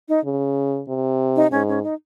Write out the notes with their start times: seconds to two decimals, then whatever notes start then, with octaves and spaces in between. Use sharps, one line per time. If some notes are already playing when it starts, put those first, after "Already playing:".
0.09 D#4
0.24 C#3
0.88 C3
1.36 D#4
1.52 G#2 C#4
1.68 C#4
1.83 D#4